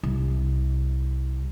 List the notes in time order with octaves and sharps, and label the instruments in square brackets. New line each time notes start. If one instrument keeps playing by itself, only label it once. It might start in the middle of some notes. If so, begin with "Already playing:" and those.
[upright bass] C2